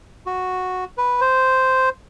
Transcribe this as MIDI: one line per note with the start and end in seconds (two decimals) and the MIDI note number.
0.26 0.84 66
0.98 1.20 71
1.21 1.89 72